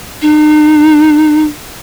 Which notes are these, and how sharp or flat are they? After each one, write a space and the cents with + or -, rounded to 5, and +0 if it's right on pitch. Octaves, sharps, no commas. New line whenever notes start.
D#4 -40